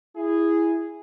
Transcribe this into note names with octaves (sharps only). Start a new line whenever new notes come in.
E4 G#4